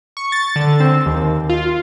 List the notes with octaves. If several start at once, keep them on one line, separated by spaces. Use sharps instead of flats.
C#6
A6
D3
C4
D#2
F4